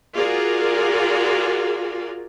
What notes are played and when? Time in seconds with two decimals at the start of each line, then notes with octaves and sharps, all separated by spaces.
0.15 F4 F#4 G#4 A#4 D5